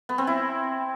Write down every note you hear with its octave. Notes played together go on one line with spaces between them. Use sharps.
B3
C4
E4